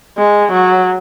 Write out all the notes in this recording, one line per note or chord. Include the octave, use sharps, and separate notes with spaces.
G#3
F#3